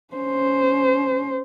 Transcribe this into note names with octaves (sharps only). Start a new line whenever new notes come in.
C#4 C5